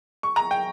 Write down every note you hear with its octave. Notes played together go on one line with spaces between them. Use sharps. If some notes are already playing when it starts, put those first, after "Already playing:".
C#6
A#5
G5